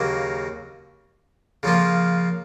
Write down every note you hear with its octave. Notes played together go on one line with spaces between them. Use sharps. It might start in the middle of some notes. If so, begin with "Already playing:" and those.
Already playing: D#2 C#3 F#3 A#3
C#3 F3 A#3 F4